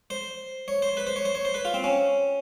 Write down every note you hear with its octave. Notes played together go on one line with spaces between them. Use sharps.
C5
C#5
C5
B4
C5
C#5
C5
C#5
C5
B4
F4
C4
C#4